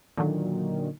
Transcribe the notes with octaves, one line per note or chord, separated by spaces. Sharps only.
A#2 D3 D#3 F#3